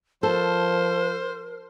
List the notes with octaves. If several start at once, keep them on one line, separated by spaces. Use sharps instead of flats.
F3 A4 A#4 C5